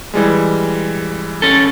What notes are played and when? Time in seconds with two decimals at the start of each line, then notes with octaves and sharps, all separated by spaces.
0.14 E3 G3 G#3
1.42 C#4 A4